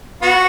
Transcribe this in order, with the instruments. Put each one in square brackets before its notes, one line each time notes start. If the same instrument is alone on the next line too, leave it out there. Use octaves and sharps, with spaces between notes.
[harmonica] B3 F#4